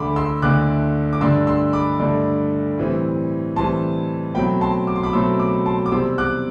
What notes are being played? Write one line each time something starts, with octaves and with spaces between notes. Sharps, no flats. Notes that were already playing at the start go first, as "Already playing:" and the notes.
Already playing: D2 D3 A3 B5 C6 D6
C6 E6
D2 D3 A3 D6 F#6
D6
G2 D3 A3 D4 C6 E6
C6 E6
B5 D6
G2 D3 A3 D4
A2 E3 G3 C4
A2 E3 G3 C4 A5 C6
B2 F#3 A3 C4 G5 B5
A5 C6
D6
C6
B5 D6
B2 F#3 A3 C4 C6 E6
B5 D6
A5 C6
D6
E2 C3 G3 C4 C6 E6
D6 F#6